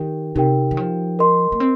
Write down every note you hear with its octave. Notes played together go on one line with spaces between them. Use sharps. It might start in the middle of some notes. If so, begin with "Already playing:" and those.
Already playing: D#3 G4 A#4 G5
C3 D#4 G4 A#4 G5
D#3
F3
A#4 D#5 C6
A#3
C4